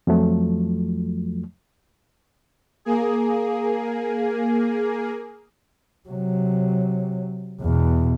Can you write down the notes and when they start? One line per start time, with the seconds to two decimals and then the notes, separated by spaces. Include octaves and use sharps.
0.07 F2 F3 F#3 A3
2.85 A#3 G#4
6.09 C3 F#3
7.61 E2 B2